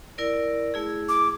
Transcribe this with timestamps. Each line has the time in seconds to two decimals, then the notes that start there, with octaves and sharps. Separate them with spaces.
0.18 E4 A#4 D5
0.74 A3 E4 G#4
1.09 D6